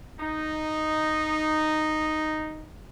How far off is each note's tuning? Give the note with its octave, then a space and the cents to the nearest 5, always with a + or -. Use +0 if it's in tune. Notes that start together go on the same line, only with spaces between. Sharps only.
D#4 -5